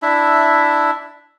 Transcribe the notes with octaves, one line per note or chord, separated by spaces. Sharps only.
D4 E4 E5